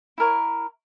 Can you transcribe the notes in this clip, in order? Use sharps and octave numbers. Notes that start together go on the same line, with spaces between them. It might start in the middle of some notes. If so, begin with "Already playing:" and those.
E4 A#4 C#5